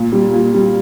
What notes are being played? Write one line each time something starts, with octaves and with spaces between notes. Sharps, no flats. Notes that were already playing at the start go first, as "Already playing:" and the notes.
Already playing: A#2
G3
A#2
G3